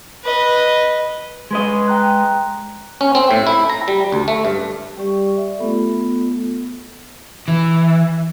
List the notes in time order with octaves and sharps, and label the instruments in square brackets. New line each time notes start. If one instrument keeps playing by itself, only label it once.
[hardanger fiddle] B4 D#5
[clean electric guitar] G#3 B4 D#5
[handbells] G5 A#5 F#6
[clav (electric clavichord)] C#4
C4
A2
E4
A#5
G3
D2
A3
G2
[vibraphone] G3 G4 D5 C#6
D5 E5
A3 B3 F4 A4
[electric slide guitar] E3